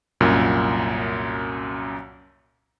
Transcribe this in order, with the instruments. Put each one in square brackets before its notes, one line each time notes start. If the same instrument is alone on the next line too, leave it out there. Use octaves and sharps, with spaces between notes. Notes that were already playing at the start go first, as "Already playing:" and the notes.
[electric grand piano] C2 F#2 A#2